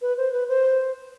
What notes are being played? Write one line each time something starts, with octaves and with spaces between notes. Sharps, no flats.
B4
C5
B4
C5